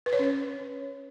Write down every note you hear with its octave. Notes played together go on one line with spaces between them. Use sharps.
B4
C#5
C#4